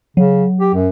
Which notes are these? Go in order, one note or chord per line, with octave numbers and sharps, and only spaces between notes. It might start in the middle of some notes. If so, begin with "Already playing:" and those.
C#3 F#3
G4
F#2